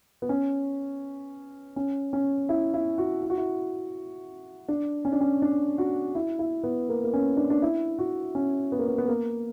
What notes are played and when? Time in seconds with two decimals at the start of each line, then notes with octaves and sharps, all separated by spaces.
0.22 B3
0.29 C#4
1.76 C#4
2.13 C#4
2.49 E4
2.74 E4
2.98 F#4
3.22 E4
3.30 F#4
3.38 E4
4.68 D4
5.05 C#4
5.12 D4
5.21 C#4
5.42 D4
5.78 F#4
6.15 E4
6.39 E4
6.63 B3
6.89 A#3
7.04 A#3
7.13 C#4
7.37 D4
7.50 D4
7.62 E4
7.99 F#4
8.35 C#4
8.72 B3
8.79 A#3
8.88 B3
8.98 B3
9.08 A#3